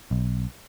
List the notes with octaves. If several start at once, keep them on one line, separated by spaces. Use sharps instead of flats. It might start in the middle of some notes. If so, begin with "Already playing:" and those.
B1